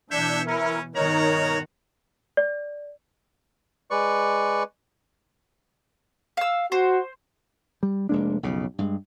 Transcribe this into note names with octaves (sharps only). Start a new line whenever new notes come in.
B2 E3 D4 C#5 E5 G6
C#4 E4 A#4
G2 B2 D#3 D#4 F#4 A#4 C#5 A#5
D5
G#3 B4 D5 C#6
F5 E6
F#4 C5
G3
F1 G#3 A#3 D4
B1 F2 C#3
G2 G#3